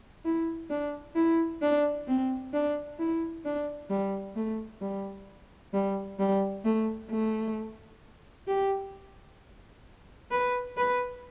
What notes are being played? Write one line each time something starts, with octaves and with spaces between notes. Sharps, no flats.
E4
D4
E4
D4
C4
D4
E4
D4
G3
A3
G3
G3
G3
A3
A3
G4
B4
B4